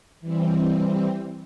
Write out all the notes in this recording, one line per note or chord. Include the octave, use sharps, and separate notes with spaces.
E3 G3 C4